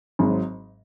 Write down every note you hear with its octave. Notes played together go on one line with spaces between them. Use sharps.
G#1 G#2 F#3